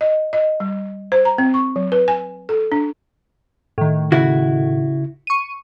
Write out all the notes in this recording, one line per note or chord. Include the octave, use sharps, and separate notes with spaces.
D#5
D#5
G3
C5
A#5
C4
C#6
F#3
B4
G#5
A4
D4
A2 D#3
C#3 E4 F#4
C#6 D#7